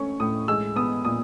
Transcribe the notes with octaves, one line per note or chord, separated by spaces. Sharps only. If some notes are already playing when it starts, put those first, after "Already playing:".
Already playing: A3 C#4 C#6
A2 D#6
G#3 E6
B3 D#6
A#2 D#6